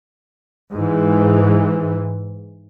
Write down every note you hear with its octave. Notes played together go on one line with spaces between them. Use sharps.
G#2 E3